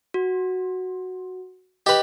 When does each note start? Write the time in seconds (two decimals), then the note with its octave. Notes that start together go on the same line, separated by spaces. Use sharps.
0.14 F#4
1.86 G4 B4 D#5